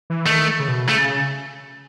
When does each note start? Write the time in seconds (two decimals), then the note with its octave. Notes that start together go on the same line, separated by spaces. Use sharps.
0.10 E3
0.26 D#3 A3
0.59 C#3
0.68 B2
0.89 C#3 A3